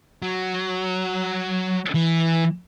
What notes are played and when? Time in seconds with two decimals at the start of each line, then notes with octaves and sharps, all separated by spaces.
0.22 F#3
1.94 E3